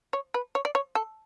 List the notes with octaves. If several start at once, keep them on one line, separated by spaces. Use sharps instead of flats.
C#5
B4
C#5
D5
C#5
A4